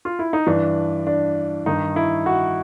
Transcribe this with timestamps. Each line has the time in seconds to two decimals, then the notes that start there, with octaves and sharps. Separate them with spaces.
0.05 F4
0.19 E4
0.33 D#4
0.47 G2 E3 D4
1.07 D4
1.66 G2 D#3 D#4
1.96 E4
2.26 F#4